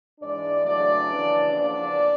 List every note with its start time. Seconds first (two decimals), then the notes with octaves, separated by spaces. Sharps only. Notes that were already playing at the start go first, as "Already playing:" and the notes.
0.20 G#2 E3 G#3 D4 D5
0.63 E2 C#3 F#3 A3 D4 D5
1.08 D#2 C#3 E3
1.51 E2 C#3 F3 A#3 D4 D5